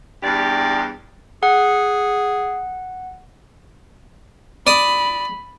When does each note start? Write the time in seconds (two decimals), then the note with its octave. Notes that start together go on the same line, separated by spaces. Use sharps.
0.23 E2 G2 G4 D5
1.43 G#4 F#5
4.67 D5 B5 D#6